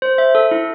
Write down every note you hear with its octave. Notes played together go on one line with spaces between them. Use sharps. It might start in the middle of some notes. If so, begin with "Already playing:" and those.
C5
E5
A4
E4